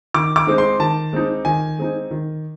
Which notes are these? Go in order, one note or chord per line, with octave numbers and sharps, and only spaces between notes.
D#3 D6
D6
G#3 C4 D#4
C6
D#3 A5
G#3 C4 D#4
D#3 G#5
G#3 C4 D#4
D#3